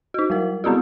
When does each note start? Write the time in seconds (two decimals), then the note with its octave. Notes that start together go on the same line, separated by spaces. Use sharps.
0.14 D#4 F#4
0.30 F#3 G3 A#4
0.64 G3 B3 C4 F4 F#4